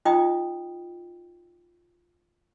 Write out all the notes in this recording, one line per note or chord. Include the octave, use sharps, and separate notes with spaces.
D#4 F4 D#5 G5 A#5 D#6